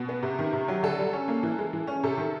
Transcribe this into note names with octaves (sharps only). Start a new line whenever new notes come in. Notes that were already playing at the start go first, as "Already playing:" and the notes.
Already playing: B2
B3
C3
D#3
C3
F#3
D3 A4
G3
C#4
A#3
E3
G#3
E3
C#4
C3 A4
D#3